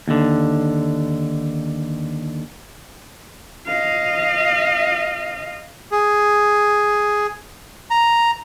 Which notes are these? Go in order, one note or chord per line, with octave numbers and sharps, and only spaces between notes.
D#2 D3
D#5 F5
G#4
A#5